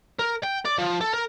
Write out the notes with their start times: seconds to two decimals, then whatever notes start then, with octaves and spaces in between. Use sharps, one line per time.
0.19 A#4
0.43 G5
0.65 D5
0.78 F3
1.01 A4
1.13 A#4